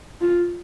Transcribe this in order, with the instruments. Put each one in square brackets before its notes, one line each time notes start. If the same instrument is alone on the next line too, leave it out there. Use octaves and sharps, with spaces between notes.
[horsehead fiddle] F4